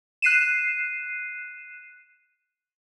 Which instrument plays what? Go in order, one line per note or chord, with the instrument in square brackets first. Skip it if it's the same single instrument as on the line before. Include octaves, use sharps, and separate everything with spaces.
[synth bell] F#6 C7 D#7 E7